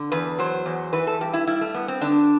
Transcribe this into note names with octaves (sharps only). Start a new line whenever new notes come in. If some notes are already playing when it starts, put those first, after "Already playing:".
Already playing: D3
E2 B4
F#3 C5
E2
E3 B4
A4
G2 G4
E4
G3 E4
A3
G2 B3
C4
D3 D4